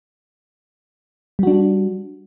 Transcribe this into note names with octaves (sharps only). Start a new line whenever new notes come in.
G3 D4 F#4